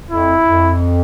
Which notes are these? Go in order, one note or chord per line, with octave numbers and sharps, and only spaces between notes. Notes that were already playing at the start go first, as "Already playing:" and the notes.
F2 E4
F2